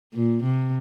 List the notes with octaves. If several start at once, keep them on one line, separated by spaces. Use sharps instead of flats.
A#2
C3